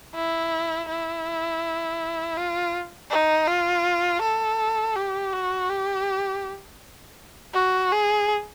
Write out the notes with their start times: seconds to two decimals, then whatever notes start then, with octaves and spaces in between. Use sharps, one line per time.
0.15 E4
0.89 E4
2.37 F4
3.10 D#4
3.47 F4
4.22 A4
4.95 G4
5.33 F#4
5.70 G4
7.54 F#4
7.92 G#4